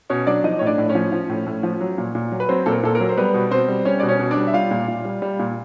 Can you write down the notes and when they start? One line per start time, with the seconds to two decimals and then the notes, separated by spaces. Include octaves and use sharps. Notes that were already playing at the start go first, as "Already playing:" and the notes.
0.10 B2 C#4 C#5
0.27 F#3 D4 D5
0.44 F3 D#4 D#5
0.59 A2 C#5
0.66 D4 D5
0.78 A2
0.89 C#4 C#5
0.95 F3
1.12 F3
1.30 A2
1.46 A2
1.63 F3
1.81 F#3
1.98 A#2
2.15 A#2
2.32 F#3
2.40 B4
2.49 F#3 C4 C5
2.66 A#2 A4
2.72 A#4
2.83 A#2 A4
2.95 A#4
3.00 F#3
3.09 C5
3.17 G3 B3 B4
3.34 B2
3.51 B2 C4 C5
3.68 G3
3.85 G3 C#4 C#5
4.00 B2 D5
4.08 C#4 C#5
4.19 B2
4.31 D4 D5
4.37 G3
4.47 E5
4.54 G3 F4 F5
4.71 A#2
4.88 A#2
5.05 G3
5.22 G3
5.39 A#2